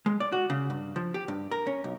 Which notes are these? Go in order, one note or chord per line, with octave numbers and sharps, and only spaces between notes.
G#3
D5
F#4
C#3
G2
F3
G4
G2
A#4
C#4
B1